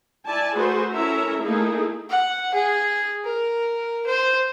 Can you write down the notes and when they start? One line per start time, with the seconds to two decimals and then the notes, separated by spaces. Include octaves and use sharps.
0.26 E4 D5 G#5 A5
0.55 A3 F#4 G#4 B4 C5
0.92 C#4 E4 A4 A#4 E5 A#5
1.40 A3 A#3 D#4 E4 G#4 A4
2.09 F#5
2.54 G#4
3.24 A#4
4.06 C5